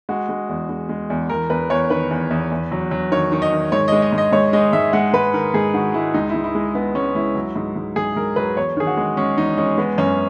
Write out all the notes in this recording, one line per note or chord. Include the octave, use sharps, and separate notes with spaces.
G#3 F#4
G#3
E2
G#3
G#3
E2
E2 A#4
E2 B4
E2 C#5
D#3 B4
E2
E2
E2
F#3
F#3
D#3 C#5
D#3
D#5
D#3
G#2 C#5
G#3 D#5
D#5
G#2
D#5
G#2 C#5
G#3 D#5
G#2 E5
G#3 F#5
G#2 B4
D#3 A#4
G#2 G#4
D#3 F#4
G#3 E4
C#2 D#4
C#2 E4
E4
G#3
G#3 B3
C#2 C#4
C#2 E4
F#3
G#2
G#2
G#2 G#4
G#2 A#4
F#3 B4
E2 C#5
D#3 G#4
F#4
G#3
G#3 C#4
E2 D#4
G#3 C#4
G#3 B3
F#2 C#4